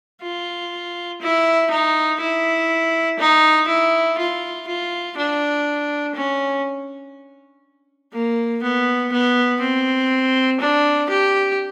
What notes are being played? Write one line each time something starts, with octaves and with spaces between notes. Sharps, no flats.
F4
E4
D#4
E4
D#4
E4
F4
F4
D4
C#4
A#3
B3
B3
C4
D4
G4